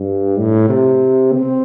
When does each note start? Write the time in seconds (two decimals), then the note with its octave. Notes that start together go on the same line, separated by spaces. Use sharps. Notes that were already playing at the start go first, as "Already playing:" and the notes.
Already playing: G2
0.39 A2
0.69 C3
1.34 C4